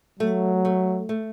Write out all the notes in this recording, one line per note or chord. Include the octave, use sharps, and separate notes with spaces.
F#3 A3
A3
A3